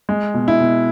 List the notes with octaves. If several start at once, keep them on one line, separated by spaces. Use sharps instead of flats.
G#3
B2
E4
B2